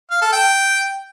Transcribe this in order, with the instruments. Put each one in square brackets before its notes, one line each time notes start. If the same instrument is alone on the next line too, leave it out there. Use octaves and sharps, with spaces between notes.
[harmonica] F5
A4
G5